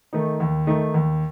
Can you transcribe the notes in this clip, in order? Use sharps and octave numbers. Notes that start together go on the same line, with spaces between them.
D#3 A3 D#4
D#2
D#3 A3 D#4
D#2